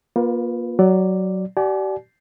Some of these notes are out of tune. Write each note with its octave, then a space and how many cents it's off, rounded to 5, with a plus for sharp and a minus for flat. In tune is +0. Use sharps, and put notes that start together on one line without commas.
A#3 +30 F4 +10 B4 +0
F#3 +15 D5 +0
G4 -40 D5 +0 G#5 +45